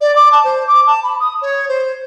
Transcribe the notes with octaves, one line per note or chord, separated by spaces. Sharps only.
D5
D6
A5
C5
D6
A5
B5
D#6
C#5
C5